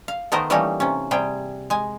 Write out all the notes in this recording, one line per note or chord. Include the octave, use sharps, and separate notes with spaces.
F5
D#3 A3 B3 A#4 C5 D#5
E3 G3 A3 A#3 C#4 D#4
C3 C#4
C3 G3 G#4 G5
G#3 G#5